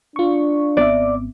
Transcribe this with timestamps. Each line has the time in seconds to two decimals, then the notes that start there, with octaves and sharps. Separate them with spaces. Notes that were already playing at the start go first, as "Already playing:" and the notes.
0.16 D4 F4 C#6
0.77 G#1 B3 C4 D5 E5 D6